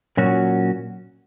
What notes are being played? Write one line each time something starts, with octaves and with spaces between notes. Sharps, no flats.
A#2 F#3 C#4 F#4